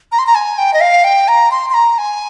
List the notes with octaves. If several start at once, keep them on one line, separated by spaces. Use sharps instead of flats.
A#5
C6
A#5
G#5
G5
D#5
F5
G5
A#5
C6
C6
A#5
G#5